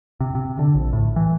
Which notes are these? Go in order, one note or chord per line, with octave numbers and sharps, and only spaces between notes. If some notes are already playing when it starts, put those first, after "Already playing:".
C3
C3
D3
A#1
A2
E3